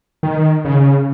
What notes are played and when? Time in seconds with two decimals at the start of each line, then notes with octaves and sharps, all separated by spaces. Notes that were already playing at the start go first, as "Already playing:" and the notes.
0.23 D#3
0.65 C#3